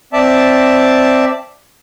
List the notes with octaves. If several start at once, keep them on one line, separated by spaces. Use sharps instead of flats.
C4 D5 E5 A5